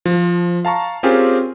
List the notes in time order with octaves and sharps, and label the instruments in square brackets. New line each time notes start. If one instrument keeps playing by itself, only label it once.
[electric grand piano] F3
F5 A5 A#5 C#6
C4 C#4 F4 G4 G#4 A#4